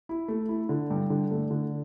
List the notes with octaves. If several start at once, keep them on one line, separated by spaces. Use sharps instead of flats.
E4
A3
E4
D3
G2
D3
A3
D3